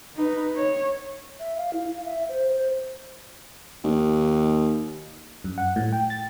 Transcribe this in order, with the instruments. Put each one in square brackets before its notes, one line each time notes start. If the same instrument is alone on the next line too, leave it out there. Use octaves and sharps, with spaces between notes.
[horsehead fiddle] D#4 B4
C#5
[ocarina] E5
F5
E4
F5
E5
C5
C5
[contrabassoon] D#2
[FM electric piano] F#2
F#5
A2
G5
A6